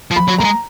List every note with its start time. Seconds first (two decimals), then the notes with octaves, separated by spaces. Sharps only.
0.11 F3
0.16 B5
0.28 F#3
0.38 A#3 A#5
0.44 G#3